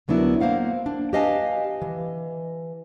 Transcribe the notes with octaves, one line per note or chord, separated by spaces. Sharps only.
D2 F#3 B3 D4 E4 A#4
A#3 C5 F5 F#5
D4
G4 B4 D#5 F5 G#5 A5
E3